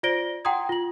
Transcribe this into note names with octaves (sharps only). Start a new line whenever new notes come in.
F4 C5 D5 A#6 D7 G7
F#5 G5 A#5 C6 D#6 G#6
F4 F#7